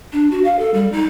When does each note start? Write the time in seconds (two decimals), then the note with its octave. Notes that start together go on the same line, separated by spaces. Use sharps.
0.13 D4
0.31 F#4
0.45 F5
0.59 A4
0.74 G3
0.92 D#4